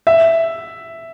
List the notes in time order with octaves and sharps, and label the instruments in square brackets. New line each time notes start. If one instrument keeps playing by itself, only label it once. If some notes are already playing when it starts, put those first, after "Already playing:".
[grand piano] E5